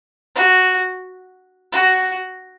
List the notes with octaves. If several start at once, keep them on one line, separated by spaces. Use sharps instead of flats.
F#4
F#4